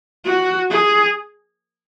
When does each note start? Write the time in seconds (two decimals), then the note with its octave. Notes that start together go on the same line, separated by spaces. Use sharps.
0.25 F#4
0.70 G#4